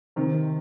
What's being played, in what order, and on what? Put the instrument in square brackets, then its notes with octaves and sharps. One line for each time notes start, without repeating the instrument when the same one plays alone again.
[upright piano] C3 D#3